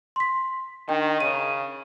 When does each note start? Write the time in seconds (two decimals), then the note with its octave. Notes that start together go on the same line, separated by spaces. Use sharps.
0.16 C6 B6
0.89 D#3 D4 G5
1.20 C#3 D#7